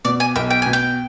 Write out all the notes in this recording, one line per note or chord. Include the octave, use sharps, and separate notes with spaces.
B2 D5
G#5
B1 G5
G5
B2 G#5
G5